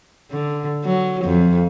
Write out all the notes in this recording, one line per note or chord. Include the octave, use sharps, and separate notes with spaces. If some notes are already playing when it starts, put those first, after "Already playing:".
D3
F#3
F2